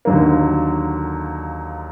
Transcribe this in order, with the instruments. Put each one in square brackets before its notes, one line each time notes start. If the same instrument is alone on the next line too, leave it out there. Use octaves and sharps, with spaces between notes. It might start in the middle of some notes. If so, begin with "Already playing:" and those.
[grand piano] D#2 D3 F#3 A#3